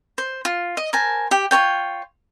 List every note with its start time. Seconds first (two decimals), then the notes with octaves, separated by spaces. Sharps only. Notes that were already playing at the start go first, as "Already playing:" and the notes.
0.18 C5
0.45 F4
0.77 D#5
0.93 A#4 C5 G#5 A5
1.31 G4 G5
1.51 F4 A4 C#5 G5